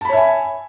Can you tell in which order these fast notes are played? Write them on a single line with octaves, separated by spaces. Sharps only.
A5 B5 C#5 E5 G#5